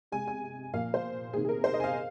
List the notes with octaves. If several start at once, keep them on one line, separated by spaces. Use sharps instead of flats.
C3 G#3 G#5
G#5
A#2 F3 A#3 F5
C5
C3 D#3 A#3 G#4
G#4
A#4
C5
D#5
G#5
F5